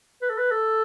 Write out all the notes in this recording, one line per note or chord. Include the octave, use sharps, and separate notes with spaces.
B4
A4
B4
A4